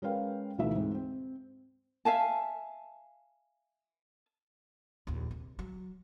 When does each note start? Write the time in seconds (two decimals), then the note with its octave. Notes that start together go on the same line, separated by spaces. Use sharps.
0.02 G#3 C#4 A#4 B4 F5 G5
0.58 D2 B2 E3 A3 D#4 E5
0.75 G#2 C4
0.95 C4
2.05 E5 F5 G#5 A5
5.07 A#1 D#2
5.31 C3
5.59 F#3